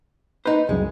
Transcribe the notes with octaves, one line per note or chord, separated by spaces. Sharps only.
D#4 B4 C5
C2 F#2 G#3